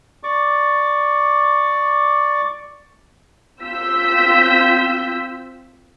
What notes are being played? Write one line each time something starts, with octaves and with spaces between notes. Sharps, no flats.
D5 C#6 D6
C4 F4 E6 G6 B6